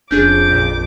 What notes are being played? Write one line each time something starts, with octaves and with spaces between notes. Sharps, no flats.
E1 F2 C#4 D4 G#4 D6 G6
A1 A#2